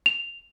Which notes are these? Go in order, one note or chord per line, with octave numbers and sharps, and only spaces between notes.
F7